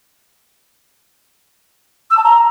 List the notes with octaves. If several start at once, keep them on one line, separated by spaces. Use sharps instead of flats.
E6
A5
A#5